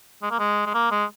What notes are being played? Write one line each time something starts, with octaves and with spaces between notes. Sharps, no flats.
G#3
A#3
G#3
G#3
A#3
G#3